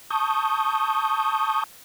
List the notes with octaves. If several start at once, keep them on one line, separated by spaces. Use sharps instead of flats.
A5 C#6 D#6 G6